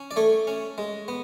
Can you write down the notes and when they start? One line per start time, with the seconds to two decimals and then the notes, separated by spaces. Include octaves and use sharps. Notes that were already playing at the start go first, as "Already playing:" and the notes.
Already playing: C#4
0.11 D5
0.16 A3 A4 C#5
0.47 C#4
0.78 G#3
1.08 B3